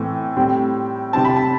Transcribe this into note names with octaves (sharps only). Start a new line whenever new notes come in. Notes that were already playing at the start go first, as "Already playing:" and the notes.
Already playing: A2 E3 A3 C4
A2 G3 C4
C3 G3 C4 A5
B5
A5